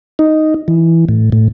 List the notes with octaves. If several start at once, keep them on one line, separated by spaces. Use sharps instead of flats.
D#4
E3
A2
A2